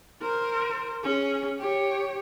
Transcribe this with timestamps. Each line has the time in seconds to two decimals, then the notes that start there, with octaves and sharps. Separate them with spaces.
0.22 A#4 C5
1.03 C#4 G#4
1.59 G4 C#5